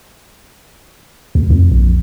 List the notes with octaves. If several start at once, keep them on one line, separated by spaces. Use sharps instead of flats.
D2
F2
A#1